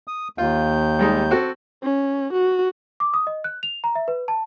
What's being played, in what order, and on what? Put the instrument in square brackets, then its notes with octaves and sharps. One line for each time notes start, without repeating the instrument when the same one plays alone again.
[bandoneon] D#6
[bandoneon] D#2 G6 [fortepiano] F4
[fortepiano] G3 G#3 D#4
C4 F#4 A4
[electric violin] C#4
F#4
[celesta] D6
D#6
D#5
F#6
F7
A#5
E5
B4
A5